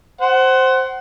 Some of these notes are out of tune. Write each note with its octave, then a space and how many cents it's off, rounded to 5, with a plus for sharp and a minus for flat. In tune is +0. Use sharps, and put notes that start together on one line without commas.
C5 +0 F#5 +25